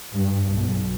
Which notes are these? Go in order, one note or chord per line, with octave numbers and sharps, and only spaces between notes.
G2
B1